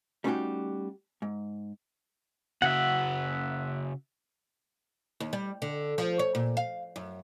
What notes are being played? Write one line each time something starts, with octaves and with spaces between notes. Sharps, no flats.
G3 A3 C#4 D#4 F#4 G4
G#2
C#3 F#4 E5 F#5
D#2
G3
D3
F3
C#5
A#2
F5
F#2